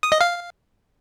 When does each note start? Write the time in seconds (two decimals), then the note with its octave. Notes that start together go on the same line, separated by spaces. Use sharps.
0.03 D#6
0.12 D#5
0.21 F5